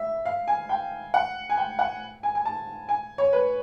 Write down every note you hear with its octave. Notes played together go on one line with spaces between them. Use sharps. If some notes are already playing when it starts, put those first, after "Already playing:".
Already playing: E5
F5
G#5
G5
F#5
G#5
G5
F#5
G#5
G#5
A5
G#5
C#5
B4